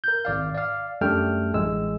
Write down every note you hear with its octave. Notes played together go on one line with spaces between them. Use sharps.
A#4 G6
G#1 D5 F5
D5 F5
F#2 G3 A3 D4 G5 F6
A1 G#3 E6